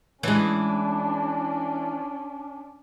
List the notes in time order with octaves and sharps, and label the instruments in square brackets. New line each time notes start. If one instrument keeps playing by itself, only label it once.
[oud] E3 G#3 [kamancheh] C#4 D4